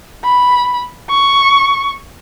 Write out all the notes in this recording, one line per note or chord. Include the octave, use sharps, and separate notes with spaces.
B5
C#6